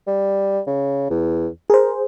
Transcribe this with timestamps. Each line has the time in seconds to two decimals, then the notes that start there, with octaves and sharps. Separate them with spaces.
0.07 G3
0.67 C#3
1.10 E2
1.70 G#4 A#4 C5